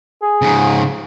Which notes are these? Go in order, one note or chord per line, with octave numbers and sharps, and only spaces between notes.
G#4
G#2 C#3